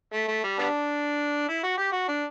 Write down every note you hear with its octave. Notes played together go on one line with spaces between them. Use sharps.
A3
A3
G3
G3 B3 D4
E4
F#4
G4
F#4
D4